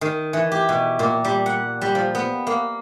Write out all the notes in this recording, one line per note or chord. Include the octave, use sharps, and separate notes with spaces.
D#3
E3
G4
B2
A#2
G3
F#5
G3
F3
B3
A#3